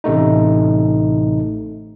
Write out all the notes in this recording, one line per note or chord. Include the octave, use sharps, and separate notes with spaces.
A1 C3 A3 D#4